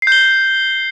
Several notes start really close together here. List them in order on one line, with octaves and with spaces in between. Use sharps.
C7 G6 G7